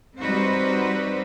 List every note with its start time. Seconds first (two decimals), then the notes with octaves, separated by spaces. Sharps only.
0.20 G3 C4 D#4 F#4 B4 C5